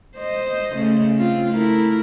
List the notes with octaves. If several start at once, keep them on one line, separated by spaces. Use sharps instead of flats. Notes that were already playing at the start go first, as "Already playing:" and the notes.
C5 D#5
C#3 A3
C4 F4
A3 E4 A#4